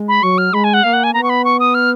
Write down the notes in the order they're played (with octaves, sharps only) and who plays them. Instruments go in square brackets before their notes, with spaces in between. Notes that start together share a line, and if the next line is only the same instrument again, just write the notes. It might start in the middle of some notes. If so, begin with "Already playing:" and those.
Already playing: [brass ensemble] G#3
[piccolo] B5
[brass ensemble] F#3 [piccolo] C#6
[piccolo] F6
[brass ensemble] G#3 [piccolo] B5
[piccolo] G#5
F#5
[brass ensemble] A#3 [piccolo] F5
[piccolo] F#5
G#5
[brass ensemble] B3 [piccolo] A#5
[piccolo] C#6
B5
C#6
D#6
F6